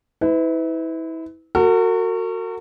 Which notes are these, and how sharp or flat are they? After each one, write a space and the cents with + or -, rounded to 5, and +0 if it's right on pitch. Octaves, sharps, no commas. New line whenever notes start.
E4 -30 B4 +30
F#4 -5 A#4 -45